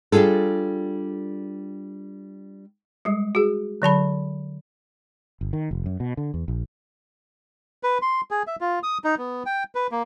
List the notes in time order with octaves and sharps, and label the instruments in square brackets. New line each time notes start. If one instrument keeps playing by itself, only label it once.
[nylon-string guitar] G3 D4 F4 G#4 A4
[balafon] G3 G#3
F#4 G#4
D3 F#3 A5 B5
[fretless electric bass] G1
D#3
F1
F#2
B2
D3
E2
A#1
[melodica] B4
C6
G#4
E5
F4
D#6
D#4
B3
G5
B4
A#3